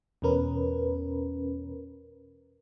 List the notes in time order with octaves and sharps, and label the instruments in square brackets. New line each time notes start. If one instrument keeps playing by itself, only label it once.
[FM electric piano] E2 B2 C#4 A#4 B4